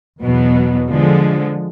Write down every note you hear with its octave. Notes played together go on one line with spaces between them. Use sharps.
E2 B2 F#3 B3
D3 F3 G#3